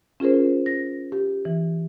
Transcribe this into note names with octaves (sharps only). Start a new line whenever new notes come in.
C#4 F4 G#4 A#4 C5
A#6
G4
E3